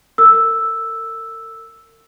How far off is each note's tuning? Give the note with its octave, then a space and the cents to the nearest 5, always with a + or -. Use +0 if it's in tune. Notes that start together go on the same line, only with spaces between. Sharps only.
A#4 -45 E6 +0